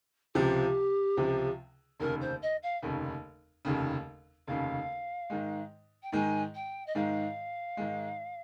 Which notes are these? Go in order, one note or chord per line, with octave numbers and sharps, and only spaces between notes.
C#2 C3 F3 G4
C#2 C3 F3
F1 D#2 C#3 A#4
C5
D#5
F5
F1 D#2 C#3
F1 D#2 C#3
F1 D#2 C#3 F5
G#2 D#3 G#3
G5
G#2 D#3 G#3 G#5
G5
D#5
G#2 D#3 G#3 F5
G#2 D#3 G#3